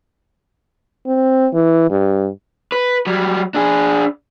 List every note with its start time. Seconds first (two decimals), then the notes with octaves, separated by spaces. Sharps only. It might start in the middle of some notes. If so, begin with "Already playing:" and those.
1.07 C4
1.53 E3
1.90 G2
2.72 B4
3.07 F#3 G3
3.55 D4 G#4